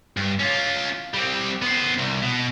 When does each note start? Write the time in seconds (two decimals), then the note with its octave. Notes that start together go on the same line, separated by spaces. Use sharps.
0.17 G2
0.39 C#4 F4
1.14 G3 C4
1.62 B3 C5
1.97 C2
2.22 B2